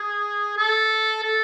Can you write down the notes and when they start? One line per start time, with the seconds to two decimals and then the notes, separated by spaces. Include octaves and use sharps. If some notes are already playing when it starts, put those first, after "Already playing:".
Already playing: G#4
0.57 A4
1.23 A4